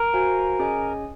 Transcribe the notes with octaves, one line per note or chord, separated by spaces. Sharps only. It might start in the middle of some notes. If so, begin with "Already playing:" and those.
Already playing: A#4
F#4 C5 F5 G#5
C#4 G#4 D#5 G#5